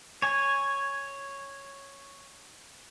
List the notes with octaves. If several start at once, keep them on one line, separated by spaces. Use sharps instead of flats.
C#5 G#5